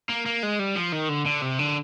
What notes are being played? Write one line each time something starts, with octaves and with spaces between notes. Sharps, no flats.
A#3
A#3
G#3
G3
F3
D#3
D3
D3
C3
D3